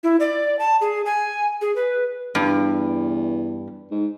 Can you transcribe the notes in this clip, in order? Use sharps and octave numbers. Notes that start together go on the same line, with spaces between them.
E4
D5
A5
G#4
G#5
G#4
B4
E2 G2
G#2